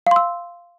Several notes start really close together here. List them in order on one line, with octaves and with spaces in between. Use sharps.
F5 C6 E6